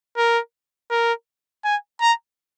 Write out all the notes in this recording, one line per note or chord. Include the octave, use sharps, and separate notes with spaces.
A#4
A#4
G#5
A#5